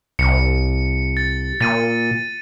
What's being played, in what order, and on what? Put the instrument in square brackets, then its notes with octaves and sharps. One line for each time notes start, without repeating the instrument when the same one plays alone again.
[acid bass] C2 [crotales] C#7
[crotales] A6
[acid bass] A#2 [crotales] A6 D#7